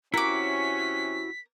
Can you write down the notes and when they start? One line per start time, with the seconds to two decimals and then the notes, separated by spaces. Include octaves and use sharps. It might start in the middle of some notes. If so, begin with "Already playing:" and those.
0.14 C3 C#4 E4 F#4 A#4 D6 B6